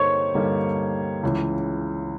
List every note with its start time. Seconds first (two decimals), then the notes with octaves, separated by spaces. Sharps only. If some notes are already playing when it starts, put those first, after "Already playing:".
Already playing: G2 D3 G3 A#3 D#4 C5 C#5 C#6
0.35 G2 D3 G3 A#3 D#4
1.23 C#2 C#3 E3